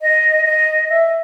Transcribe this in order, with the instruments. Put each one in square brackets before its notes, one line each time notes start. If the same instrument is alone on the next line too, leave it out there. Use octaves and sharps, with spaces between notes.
[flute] D#5
D#5
E5